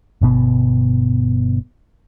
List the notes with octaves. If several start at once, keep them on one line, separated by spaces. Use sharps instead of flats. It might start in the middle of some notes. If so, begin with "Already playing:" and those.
G1 B2 B3